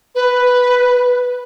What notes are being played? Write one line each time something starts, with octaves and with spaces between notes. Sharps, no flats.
B4